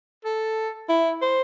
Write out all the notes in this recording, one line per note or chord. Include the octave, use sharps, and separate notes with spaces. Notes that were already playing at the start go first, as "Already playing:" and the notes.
A4
E4
C5